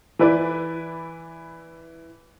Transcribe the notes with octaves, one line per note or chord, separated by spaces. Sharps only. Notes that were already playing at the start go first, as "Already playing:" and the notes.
E3 E4 B4 D5